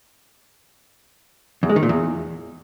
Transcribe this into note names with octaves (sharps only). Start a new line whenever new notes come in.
E2
G#3
D#3
A#2
E2